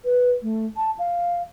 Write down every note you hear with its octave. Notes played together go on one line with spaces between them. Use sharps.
B4
A3
A5
F5